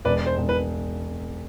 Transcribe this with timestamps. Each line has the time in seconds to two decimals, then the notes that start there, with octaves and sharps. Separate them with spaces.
0.05 E1 B4 D5
0.26 C5
0.38 E1
0.49 B4